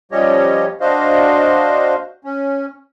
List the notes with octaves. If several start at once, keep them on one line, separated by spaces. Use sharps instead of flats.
F3 G3 C#4 G4 C#5 D#5
D4 F#4 C5 D#5 F5
C#4